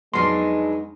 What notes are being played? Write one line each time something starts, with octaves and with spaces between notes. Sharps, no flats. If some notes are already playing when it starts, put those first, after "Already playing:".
F2 F#3 G#3 B3 D4 D#4 C6